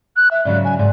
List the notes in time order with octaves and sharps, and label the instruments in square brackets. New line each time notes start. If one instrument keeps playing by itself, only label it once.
[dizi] F#6
E5
[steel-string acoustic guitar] G#2 C#3 F#3 [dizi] D5
[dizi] G#5
[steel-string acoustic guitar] G#2 [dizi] D5